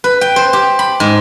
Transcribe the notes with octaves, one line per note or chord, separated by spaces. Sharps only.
B4
G5
C5
G4
B5
G#2